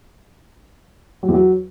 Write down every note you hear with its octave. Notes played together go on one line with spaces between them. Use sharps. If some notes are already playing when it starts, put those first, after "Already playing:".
F#3
E2
F#3